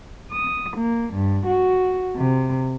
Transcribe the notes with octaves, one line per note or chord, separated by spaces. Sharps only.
D#6
A#3
G2
F#4
C3